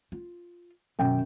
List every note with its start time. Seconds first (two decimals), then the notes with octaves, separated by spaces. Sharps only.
0.12 F4
0.99 F#2 B2 D#3 G5